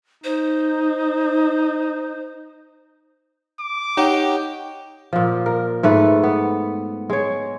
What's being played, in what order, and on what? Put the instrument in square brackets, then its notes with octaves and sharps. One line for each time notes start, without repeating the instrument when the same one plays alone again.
[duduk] D#4 [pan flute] C5
[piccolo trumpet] D6
[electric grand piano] D#4 [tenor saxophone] G4 [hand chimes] C#5 F#5
[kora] A#2 F3
A#4
G#2 A3 B4
B3
G#3 C#5